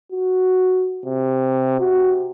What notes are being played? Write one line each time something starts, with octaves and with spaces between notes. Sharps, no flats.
F#4
C3
F#4